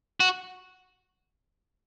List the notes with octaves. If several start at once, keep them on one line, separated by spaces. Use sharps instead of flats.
F#4